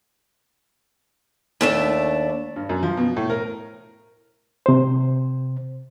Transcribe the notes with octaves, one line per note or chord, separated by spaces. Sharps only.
D#2 A3 D4
G2
F#2
F3
B2
A2
A#4
C3 C5